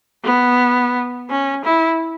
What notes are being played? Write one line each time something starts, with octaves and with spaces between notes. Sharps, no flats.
B3
C#4
E4